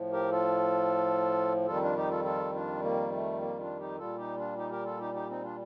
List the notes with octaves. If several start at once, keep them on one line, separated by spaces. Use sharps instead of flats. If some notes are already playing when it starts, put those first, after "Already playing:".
Already playing: A2 F3
G4 A#4
F4 A4
F2 D#3 G3 F4 A4
D4 F4
D#4 G4
F4 A4
F4 A4
D4 F4
A#3
A3
A#3
D4 F4
D#4 G4
A#2 G3 F4 A4
D#4 G4
D4 F4
D#4 G4
G4 A#4
F4 A4
D#4 G4
D#4 G4
C4 D#4
D4 F4